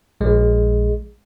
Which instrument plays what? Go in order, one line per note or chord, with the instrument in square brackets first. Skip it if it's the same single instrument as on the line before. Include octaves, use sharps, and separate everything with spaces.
[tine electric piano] A#1 G#3